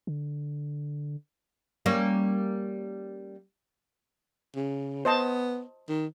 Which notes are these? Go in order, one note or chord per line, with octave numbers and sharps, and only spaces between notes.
D3
G3 A#3 C#4
C#3
B3 C5 D#5 A5
D#3